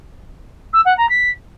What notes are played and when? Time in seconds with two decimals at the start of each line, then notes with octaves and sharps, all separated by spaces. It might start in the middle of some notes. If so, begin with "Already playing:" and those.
0.73 E6
0.85 F#5
0.97 A#5
1.09 B6